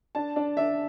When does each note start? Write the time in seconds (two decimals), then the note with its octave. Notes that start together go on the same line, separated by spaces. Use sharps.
0.15 D4 A5
0.36 D4
0.57 D4 E5